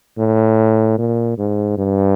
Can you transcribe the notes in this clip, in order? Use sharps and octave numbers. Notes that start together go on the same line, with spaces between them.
A2
A#2
G#2
G2